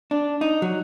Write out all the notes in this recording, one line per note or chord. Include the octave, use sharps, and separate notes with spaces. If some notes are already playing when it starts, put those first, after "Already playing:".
D4
D#4
F#3